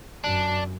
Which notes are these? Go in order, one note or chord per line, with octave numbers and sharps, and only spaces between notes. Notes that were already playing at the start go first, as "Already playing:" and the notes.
F#2 D4